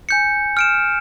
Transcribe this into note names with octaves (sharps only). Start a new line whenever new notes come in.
G#5 G6 C#7
F6 D7 E7